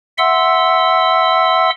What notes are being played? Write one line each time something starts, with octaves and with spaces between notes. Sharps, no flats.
E5 F#5 C6 E6